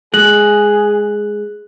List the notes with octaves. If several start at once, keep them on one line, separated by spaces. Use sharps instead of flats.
G#3 G#4 F#6 F#7